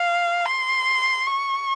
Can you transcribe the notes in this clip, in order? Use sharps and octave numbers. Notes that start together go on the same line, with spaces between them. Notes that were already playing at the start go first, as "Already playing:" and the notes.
Already playing: F5
C6
C#6